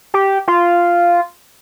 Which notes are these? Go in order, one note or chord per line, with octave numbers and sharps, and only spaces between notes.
G4
F4